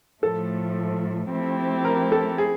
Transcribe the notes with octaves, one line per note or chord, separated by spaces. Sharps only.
A2 F3 A3 A4
F3 A3 C4 E4 G4
A#4
A4
G#4